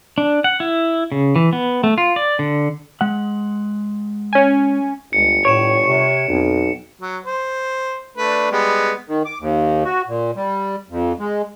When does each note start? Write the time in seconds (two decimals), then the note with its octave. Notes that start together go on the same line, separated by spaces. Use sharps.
0.18 D4
0.44 F#5
0.60 E4
1.12 C#3
1.36 E3
1.53 B3
1.84 A3
1.98 F4
2.16 D5
2.39 D3
3.01 G#3 F#5
4.33 C#4 G#5
5.13 G1 C#2 C#7
5.45 A2 C#5 D7 E7
5.87 C3
6.29 B1 F2
7.02 F#3
7.25 C5
8.17 A3 D4 B4
8.51 G3 G#3 B3
9.08 D#3
9.25 D6
9.40 D#2
9.85 F#4
10.08 A#2
10.36 G3
10.89 F2
11.19 G#3